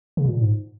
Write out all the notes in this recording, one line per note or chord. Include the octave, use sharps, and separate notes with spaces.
C#3
A#2
G#2